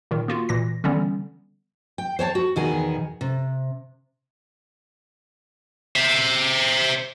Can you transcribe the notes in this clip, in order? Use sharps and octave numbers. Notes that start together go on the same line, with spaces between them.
A#2 D#3
A#3 F4 F#4
A#2 E3 A#6
D3 E3 G3 B3 C#4
G5
C5 C#5 G5 A5
F#4
E2 B2 D#3 B3 G#4 G#5
C3
C5 E5